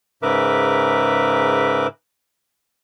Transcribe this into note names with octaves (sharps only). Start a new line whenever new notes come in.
G#2 C#3 A#4 B4 E5 D6